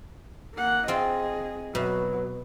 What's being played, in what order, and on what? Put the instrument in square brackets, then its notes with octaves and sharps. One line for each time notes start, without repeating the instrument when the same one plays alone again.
[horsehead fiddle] A#3 F#5
[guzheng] C4 F4 [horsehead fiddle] G#4 D#5
[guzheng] B2 [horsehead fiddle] F#3